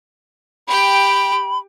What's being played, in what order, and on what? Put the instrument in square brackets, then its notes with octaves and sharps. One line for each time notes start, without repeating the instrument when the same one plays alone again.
[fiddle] G4 G5 [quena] B5